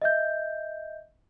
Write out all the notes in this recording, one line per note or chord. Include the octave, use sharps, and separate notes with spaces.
D#5 E5 G6